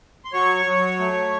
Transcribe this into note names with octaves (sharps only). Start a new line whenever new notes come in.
C6
F#3 C#5 C#6
F#3
A3